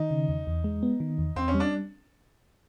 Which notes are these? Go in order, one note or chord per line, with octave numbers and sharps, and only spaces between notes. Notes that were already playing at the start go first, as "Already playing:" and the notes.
Already playing: D#3 D#4
C#3
E2
E2
G#3
B3
D#3
E2
E2 C4
C#4
G3
D4